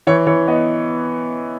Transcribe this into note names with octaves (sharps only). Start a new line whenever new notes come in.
E3 C#5
E3 C#5
B3 D#5